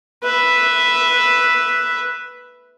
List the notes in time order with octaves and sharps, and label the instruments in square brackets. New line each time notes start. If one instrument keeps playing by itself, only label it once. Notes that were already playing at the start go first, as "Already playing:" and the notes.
[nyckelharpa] B4 E5